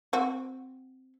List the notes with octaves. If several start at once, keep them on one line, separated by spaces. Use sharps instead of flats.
C4 F#4